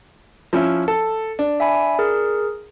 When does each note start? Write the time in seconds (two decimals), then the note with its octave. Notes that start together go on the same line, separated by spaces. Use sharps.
0.53 F3 C#4 E4
0.88 A4
1.39 D4
1.60 E5 G#5 B5
1.99 G#4 A#4